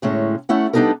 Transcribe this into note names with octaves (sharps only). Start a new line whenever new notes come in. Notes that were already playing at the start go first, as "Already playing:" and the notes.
D2 A2 G#3 C#4
A3 C#4 E4 F#5
G3 B3 D4 D#4 A4 A#4